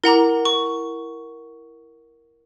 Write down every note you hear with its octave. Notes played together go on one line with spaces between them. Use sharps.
E4 A#4 F#5 A#5 D6
C#6